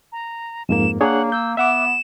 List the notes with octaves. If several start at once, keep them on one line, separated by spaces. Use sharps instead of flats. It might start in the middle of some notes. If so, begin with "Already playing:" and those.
A#5
F2 G#2 A#3 E7
A#3 D4 G#4 C#5 F#5
E6 G6
B3 E5 F#5 D6 E7